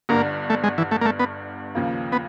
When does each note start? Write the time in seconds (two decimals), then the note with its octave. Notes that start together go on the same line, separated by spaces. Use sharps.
0.09 G1 G2 D3 A#3
0.50 A3
0.64 G#3
0.78 E3
0.91 A3
1.01 A#3
1.05 A3
1.19 B3
1.75 D#2 C#3 F3 A#3
2.12 B3